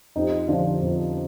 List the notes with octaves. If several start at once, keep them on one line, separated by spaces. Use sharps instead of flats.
F2 D#4 G4
D3 F3 D4 F4
F2